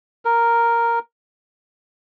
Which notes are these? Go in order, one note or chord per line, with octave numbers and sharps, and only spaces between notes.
A#4